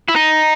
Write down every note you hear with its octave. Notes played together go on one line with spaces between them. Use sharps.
E4
D#4